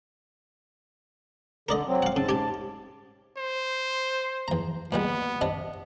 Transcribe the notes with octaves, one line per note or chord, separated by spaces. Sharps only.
D3 A#4 D5 D#5
F#3 C4
F5 F#5
G#2 C#3 A5
G4 G#5
C5
E2 A#5
A#2 G3 G#3 B3
C3 D4 D#5